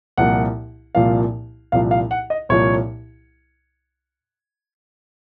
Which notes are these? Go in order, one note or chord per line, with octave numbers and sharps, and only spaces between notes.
C2 A#2 F3 A#3 F#5
C2 A#2 F3 A#3 F5
C2 A#2 F3 A#3 F5
F5
F#5
D#5
C2 A#2 F3 A#3 C#5